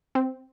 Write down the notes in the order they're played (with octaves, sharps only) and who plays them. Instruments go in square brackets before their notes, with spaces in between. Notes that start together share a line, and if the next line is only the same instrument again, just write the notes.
[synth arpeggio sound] C4